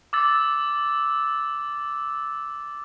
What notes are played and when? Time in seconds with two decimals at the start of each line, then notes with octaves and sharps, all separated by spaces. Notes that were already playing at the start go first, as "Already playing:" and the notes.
0.13 D6 E6 A6